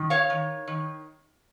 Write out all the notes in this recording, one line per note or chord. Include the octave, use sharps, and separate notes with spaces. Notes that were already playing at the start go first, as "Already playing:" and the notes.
Already playing: D#3
C#5 F5
D#3
D#3